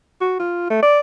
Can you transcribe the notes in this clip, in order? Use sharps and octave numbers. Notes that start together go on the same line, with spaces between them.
F#4
F4
A3
D5